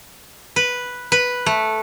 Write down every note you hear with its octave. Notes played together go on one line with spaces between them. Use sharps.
B4
B4
A3